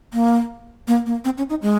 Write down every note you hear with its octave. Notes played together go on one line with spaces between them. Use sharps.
A#3
A#3
A#3
C4
C#4
D#4
G#3